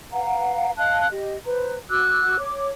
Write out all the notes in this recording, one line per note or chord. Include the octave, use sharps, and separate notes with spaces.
B4 F5 F#5 A#5
D#5 F5 A5 F#6
G4 D#5
B4 C5 A#5
F#4 D6 E6 F#6
C#5 D6